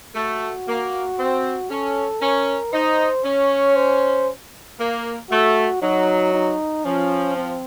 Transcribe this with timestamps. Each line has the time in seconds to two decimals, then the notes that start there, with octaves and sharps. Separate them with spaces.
0.15 A3 F#4
0.67 A#3
1.18 C4
1.70 C#4 A4
2.21 C#4 A#4
2.73 D#4 C5
3.24 C#4 C#5
3.76 C5
4.79 A#3
5.30 A3 F#4
5.82 F#3 D#4
6.34 D#4
6.85 F3 C#4
7.36 C4